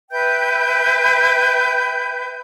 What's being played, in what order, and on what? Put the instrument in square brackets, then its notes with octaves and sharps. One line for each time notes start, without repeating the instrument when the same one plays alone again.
[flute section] B4 E5 G5 G6